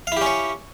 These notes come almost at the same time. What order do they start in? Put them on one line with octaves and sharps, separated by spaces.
F5 E4 G4 C#4 C#5